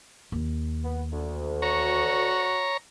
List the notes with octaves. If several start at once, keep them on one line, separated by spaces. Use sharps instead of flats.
D#2
B3
D2
F#4 C#5 A#5